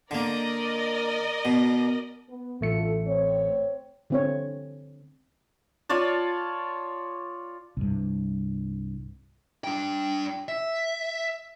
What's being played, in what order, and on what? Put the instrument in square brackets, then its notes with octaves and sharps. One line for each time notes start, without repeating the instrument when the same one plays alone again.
[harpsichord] D3 A#3 [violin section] A#4 D5 D#5
[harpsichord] B2
[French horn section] B3
[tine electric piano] A1 A3 C#7 [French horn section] D2 F4 A4
[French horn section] C4 C#5
[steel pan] D3 C4 C#5
[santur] F4 C#5 D5 A5
[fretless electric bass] C2 G2
[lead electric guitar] D4 G5
E5